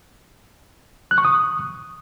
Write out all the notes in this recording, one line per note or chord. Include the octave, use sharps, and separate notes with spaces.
F#6
C#6
D#6